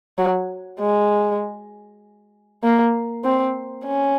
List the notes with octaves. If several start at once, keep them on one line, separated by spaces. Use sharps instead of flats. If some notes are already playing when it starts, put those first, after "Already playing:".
F#3
G#3
A#3
C4
C#4